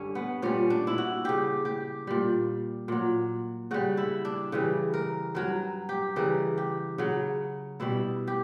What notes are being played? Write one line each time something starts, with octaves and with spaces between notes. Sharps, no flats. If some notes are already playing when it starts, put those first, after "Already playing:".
Already playing: G2 D3 G3 C#4
B3
A#2 G3 C#4
D4
E4
F#4
C#3 G3 G4
G4
A#2 G3
A#2 F#3
C#3 G3 F#4
E4
D4
C#3 E3 G3
A#4
G2 F#3 A#4
G4
C#3 E3 G3 A#4
G4
C#3 F#3
B2 G3 E4
G4